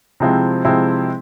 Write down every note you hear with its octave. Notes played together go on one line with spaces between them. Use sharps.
C3 F3 G#3 C4 E4
C3 F3 G#3 C4 E4